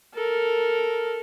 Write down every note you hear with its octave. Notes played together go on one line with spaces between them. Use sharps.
A4 A#4